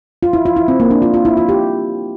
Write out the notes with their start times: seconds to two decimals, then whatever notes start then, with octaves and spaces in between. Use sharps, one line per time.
0.23 F4
0.33 E4
0.46 F4
0.56 E4
0.68 C4
0.80 A#3
0.91 D4
1.02 F4
1.14 F4
1.25 E4
1.37 F4
1.49 G4